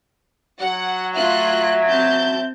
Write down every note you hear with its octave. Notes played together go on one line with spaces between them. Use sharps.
F#3 F#5
A3 F4 E5 F#6
C4 A5 G6